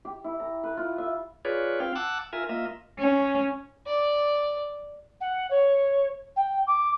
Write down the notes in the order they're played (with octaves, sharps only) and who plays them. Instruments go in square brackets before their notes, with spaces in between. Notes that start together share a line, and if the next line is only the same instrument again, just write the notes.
[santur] G4
E4
A#5
B4
F4
E5
[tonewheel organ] F4 G#4 B4 C#5 D5
C4 F4 F5 G5
F#5 A5 D6 E6 F#6
F4 A#4 E5 G#5
A#3 F4 D#5 E5
[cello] C#4
[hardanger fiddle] D5
[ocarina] F#5
C#5
G5
D6